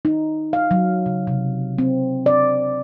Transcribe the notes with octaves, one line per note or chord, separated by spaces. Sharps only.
D#4
F5
F#3
C#3
C3
C4
D5